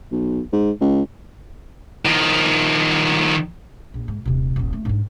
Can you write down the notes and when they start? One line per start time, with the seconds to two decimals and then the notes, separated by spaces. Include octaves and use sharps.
0.12 B1
0.53 G#2
0.81 C#2
2.05 D#3 F3
3.94 A#1
4.08 G#2
4.25 D#1 C3
4.56 D#1 A1
4.73 A3
4.85 G#2 D4